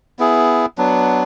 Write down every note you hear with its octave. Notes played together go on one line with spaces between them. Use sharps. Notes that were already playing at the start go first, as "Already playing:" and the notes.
B3 E4 G#4
F#3 B3 D4